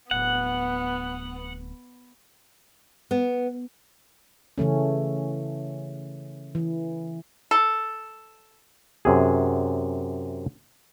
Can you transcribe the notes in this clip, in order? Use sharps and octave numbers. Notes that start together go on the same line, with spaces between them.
D1 B3 F#5
B3
C#3 E3 A3 C#4
E3
A4
F#2 C3 G#4